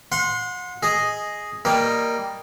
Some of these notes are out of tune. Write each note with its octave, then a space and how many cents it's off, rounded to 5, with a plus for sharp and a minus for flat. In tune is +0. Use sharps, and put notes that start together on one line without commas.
F#5 -35 C6 +0
G#4 +0 D#5 +0
G3 +0 A#3 +0 D#5 +0